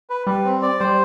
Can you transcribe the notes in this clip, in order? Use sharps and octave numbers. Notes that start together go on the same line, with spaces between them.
B4
G3 B4
C4
D5
G3 C5